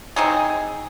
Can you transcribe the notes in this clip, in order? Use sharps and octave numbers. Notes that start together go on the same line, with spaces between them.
C4 D#4 G#4